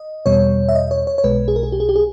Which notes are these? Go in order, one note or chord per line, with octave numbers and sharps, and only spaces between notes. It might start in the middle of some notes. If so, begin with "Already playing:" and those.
Already playing: D#5
E2 B2 G3 C#5
E5
D#5
C#5
C#5
C#5
B1 B2 G#3 B4
G#4
A#4
G#4
G4
G#4
G4
G#4